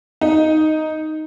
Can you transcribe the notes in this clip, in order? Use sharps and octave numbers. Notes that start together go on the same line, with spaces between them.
D#4